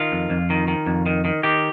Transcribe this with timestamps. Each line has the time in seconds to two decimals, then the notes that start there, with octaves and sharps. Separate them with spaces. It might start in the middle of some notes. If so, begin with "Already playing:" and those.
Already playing: D#3 F4
0.12 F2
0.30 F2
0.50 D#3
0.68 D#3
0.86 F2
1.06 D#3
1.25 D#3
1.43 D#3 G4